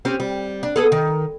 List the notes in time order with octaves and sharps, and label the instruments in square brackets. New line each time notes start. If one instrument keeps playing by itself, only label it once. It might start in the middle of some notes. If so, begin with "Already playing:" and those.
[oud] C4 C#4 G4
G3
D4
B3 G#4 A4
D#3